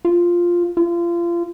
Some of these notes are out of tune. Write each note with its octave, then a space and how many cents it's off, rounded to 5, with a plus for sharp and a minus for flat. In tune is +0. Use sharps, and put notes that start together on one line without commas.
F4 +0
F4 -30